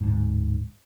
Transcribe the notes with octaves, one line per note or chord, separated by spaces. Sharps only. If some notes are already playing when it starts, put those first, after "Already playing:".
D1 G#2